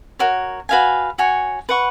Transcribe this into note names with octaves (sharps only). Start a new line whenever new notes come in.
F#4 A#4 C#5
F#4 B4 F5 G#5
F#4 C#5 G#5
B4 F#5 C#6